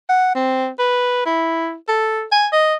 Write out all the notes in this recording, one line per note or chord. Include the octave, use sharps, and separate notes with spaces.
F#5
C4
B4
E4
A4
G#5
D#5